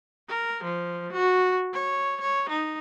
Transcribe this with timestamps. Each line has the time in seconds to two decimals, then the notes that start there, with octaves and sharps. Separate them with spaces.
0.29 A#4
0.64 F3
1.12 F#4
1.73 C#5
2.21 C#5
2.49 D#4